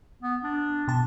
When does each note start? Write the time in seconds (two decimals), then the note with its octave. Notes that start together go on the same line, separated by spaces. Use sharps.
0.23 B3
0.43 D4
0.88 B2 A5